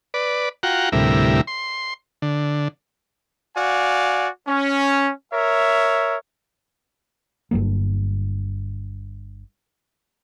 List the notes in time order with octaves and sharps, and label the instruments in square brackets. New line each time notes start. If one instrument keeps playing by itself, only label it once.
[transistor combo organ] B4 D5
F4 F#4 F#5 G5 A#5
D2 A2 C3 G3 E4 A#4
C6
D3
[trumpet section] F#4 D5 F5 G#5
C#4
A#4 C#5 E5
[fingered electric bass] G1 G2 F#3 A#3